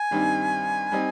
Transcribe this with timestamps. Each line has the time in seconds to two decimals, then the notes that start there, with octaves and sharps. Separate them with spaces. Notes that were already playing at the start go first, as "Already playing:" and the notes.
Already playing: G#5
0.11 G2 D#3 G3 C4 D#4
0.92 G3 C4 D#4